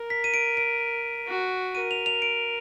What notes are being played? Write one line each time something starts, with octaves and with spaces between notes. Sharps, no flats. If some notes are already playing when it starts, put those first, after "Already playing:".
Already playing: A#4
B6
D#7
D7
D7
F#4
A#4 D#7
F7
F7
D7